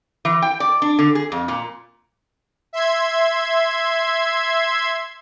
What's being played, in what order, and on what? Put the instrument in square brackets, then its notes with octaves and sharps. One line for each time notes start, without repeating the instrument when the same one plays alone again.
[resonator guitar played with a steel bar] E3
G5
D5
D4
D3
G#4
F2
A#2
[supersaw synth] E5 C6 G#6